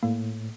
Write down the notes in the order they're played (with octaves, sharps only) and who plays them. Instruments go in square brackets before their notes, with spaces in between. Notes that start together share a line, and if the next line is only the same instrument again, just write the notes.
[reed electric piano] A2 [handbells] A#3